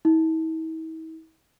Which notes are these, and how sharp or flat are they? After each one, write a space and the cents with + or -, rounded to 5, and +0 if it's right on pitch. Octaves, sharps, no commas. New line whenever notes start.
E4 -45